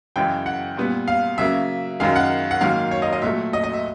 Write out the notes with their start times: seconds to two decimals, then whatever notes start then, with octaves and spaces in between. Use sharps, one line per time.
0.16 F#2 C#3 E3 G#3 G5
0.46 F#5
0.77 A#2 G3 B3
1.08 F5
1.38 C#3 F#3 A#3 E5
2.00 F#2 D#3 G#3 F5
2.16 F#5
2.51 F#5
2.61 G#2 D#3 F#3 A#3 F5
2.91 C#5
3.02 D#5
3.13 D#5
3.22 A#2 F#3 A3 E5
3.53 D#5
3.64 D#5
3.73 E5